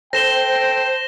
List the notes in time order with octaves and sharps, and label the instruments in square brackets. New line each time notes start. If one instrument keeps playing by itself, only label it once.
[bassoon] A4 [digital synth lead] C5 [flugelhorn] G5 [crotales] A#6 E7 G7